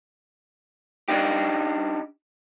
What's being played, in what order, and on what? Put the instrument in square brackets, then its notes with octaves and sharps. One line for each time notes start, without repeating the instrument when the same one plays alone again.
[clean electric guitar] D4 D#4 G4